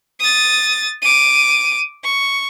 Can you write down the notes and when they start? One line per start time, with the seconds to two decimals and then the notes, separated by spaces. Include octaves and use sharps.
0.20 D#6 A6
1.02 D6 D#7
2.04 C#6